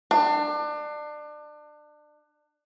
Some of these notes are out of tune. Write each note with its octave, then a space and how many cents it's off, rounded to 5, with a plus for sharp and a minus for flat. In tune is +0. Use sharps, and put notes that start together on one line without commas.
D4 +30